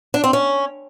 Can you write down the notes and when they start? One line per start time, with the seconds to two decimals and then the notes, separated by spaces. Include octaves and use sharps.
0.14 D4
0.24 C4
0.33 C#4